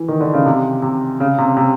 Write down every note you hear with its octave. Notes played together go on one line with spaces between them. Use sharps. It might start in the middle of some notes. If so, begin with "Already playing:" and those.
Already playing: E3
D#3
D3
C#3
C3
C3
C#3
C3
C3